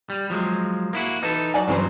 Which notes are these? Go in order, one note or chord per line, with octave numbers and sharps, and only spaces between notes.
G3
F3 F#3 G#3
A#3 E4 F#4
E3 D#4 A4
F#3 D5 G#5
G2 C#3 E3 F#3 C4 C5